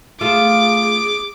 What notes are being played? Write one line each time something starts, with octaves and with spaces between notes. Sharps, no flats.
A3 F4 G#4 E5 D6